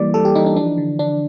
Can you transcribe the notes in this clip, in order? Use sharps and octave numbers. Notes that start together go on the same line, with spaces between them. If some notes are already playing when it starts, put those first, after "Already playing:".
Already playing: E3 G3 A#3 D5
G3 A4
G4
E3 D#4
D4
F3 D4
D3
D3 D4